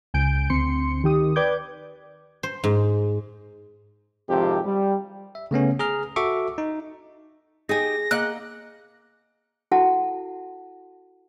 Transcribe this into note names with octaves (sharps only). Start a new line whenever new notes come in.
C#2 G#5 G6 D7
D2 C4 C6 C#7
D#3 G4 D#6
B4 D5 G5 D6 G6 G#6
C5
G#2
G#1 F2 C3 F3 G4
G3
E5
C#3 A3 B3 C#4
G#4 A#5 F6
F#4 A4 E5 C#6 D6
D#4
D#4 G4 G#4 G#5 A#6
A#3 D#5 F#5 F#6
E4 F#4 A4 F#5 A5